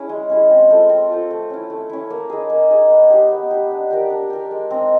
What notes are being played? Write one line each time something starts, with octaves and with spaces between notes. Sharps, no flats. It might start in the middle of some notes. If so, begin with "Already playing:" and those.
Already playing: C#4 E4 G#4
G#3
C#4 E4 G#4
C4
F4 A4 C5
C4
F4 A4 C5
A3
C#4 E4
A3
C#4 E4
A#3
D#4 G#4
A#3
D#4 G#4
B3
D#4 G4
B3
D#4 G4
D4
G4 A#4 D5
D4
G4 A#4 D5
G#3
C4 D#4